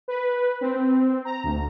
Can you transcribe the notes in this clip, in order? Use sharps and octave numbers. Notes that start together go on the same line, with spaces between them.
B4
C4
A#5
D2